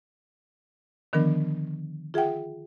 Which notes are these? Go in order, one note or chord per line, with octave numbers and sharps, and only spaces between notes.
D3 D#3 F3 B3 D4 A#4
F4 G#4 E5 F#5 G5